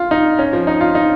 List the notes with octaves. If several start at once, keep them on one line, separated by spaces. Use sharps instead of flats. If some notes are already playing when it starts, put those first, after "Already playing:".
Already playing: F4
D#4
C#4
F3
D#4
F4
D#4